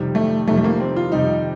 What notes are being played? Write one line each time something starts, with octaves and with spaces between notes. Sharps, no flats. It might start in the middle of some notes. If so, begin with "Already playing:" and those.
Already playing: F2 C3 D#3 G3
A3
F2 C3 D#3 G3 A3
A3
A#3
C4
F4
F2 C3 D#3 G3 D#4